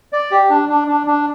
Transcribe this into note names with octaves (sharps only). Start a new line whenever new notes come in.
D5
G4
D4
D4
D4
D4